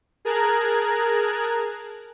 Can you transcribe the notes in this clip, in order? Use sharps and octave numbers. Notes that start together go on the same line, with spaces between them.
G#4 A#4 A5 A#5 F#6 G#6